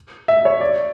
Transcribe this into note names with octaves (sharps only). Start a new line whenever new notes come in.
E5
C#5
D5